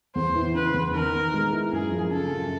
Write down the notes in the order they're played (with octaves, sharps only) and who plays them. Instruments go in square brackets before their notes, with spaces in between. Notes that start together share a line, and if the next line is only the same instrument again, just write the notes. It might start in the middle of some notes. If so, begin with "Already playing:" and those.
[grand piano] E2 [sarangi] C5
[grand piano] E3
[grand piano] C#3 [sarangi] B4
[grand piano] E2
[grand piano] D#3 [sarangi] A#4
[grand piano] B3
G#3
E4
[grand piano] F#2 [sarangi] G#4
[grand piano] F3
[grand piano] C#3 [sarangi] A4
[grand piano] F#2